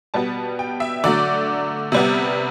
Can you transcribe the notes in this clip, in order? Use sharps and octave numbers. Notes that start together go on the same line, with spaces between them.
B2 G3 B3 A5
G5
E5
D3 F#3 A3 D5
C3 G3 B3